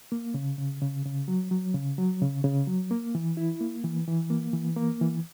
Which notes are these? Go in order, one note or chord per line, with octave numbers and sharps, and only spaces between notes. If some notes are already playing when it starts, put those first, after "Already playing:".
A#3
C#3
C#3
C#3
C#3
F#3
F#3
C#3
F#3
C#3
C#3
F#3
A#3
E3
E4
A#3
E3
E3
A#3
E3
A#3
E3